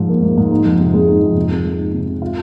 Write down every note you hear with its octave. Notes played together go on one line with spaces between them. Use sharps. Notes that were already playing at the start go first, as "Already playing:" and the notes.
Already playing: G#2 F3
A#3
G#2
G#2
D#4
F2
C3
G#3
D#4
F2
C3
C3
G#3
D#4
C3
C3
F4